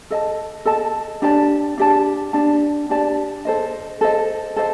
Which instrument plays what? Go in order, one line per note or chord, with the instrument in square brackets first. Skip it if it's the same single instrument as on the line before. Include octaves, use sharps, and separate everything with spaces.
[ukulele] A4 D#5 A5
A4 D#5 A5
D4 G4 D5 A5
D4 G4 D5 A5
D4 G4 D5 A5
D4 G4 D5 A5
A4 C5 D#5
A4 C5 D#5
A4 C5 D#5